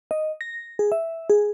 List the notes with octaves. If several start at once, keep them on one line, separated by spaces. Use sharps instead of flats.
D#5
A#6
G#4
E5
G#4